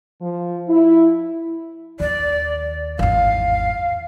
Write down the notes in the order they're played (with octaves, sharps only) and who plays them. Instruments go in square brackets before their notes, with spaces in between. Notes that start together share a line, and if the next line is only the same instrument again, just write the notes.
[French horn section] F3
E4
[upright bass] D#2 [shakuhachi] D5
[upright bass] G#1 E2 [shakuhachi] F5